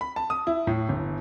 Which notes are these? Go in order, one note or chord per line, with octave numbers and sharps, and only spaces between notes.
B5
A5
D#6
E4
A2
G1